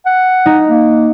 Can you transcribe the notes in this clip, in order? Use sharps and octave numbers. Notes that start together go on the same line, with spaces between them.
F#5
D#4
A#3